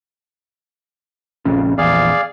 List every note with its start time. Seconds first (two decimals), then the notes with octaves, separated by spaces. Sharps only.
1.45 A#1 F2 C#3
1.78 A#1 E2 G#4 D5 F5